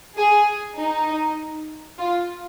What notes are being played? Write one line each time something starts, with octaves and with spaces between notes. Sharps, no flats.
G#4
D#4
F4